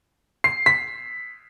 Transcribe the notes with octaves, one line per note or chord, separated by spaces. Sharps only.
C7
B6